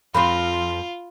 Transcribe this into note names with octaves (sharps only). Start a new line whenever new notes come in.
F2 F3 C4 F4 B5